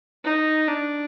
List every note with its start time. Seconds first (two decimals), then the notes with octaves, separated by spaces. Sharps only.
0.25 D#4
0.68 D4